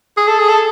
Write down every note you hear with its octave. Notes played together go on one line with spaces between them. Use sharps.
G#4
A4
G#4
A4